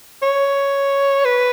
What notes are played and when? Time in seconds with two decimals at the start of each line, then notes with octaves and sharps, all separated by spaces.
0.22 C#5
1.25 B4